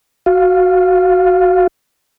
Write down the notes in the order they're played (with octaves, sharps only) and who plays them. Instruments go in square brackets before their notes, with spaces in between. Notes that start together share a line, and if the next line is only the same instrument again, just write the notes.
[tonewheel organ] F#4 F5